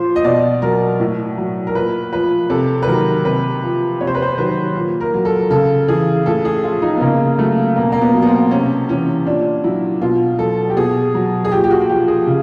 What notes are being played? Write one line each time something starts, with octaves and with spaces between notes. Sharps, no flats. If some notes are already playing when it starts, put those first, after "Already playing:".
Already playing: A#2 F3 C5
D#5
B2 D5
F#3 A#4
A2
F#3
A#4
A#2 B4
F3 B4
C3 A4
B4
D#3 F#3 A#4
C3 B4
F3
C3 C#5
C5
B4
C5
D#3 F#3 B4
A#2
A#4
F#3
A4
C#3 A4
E3 G#4
A2 A4
G#4
F3 F4
D#4
B3
C#3 A#3
F#3 A3
B2 A#3
A#3
B3
F#3
B3
C4
C3 C#4
E3 C#4
A#2 D4
F#3 E4
B2 F4
F#3 A4
G4
B2 G#4
F#3
G#4
A#2 G4
G4
F#4
F#4
F3 G4
G#4
C#3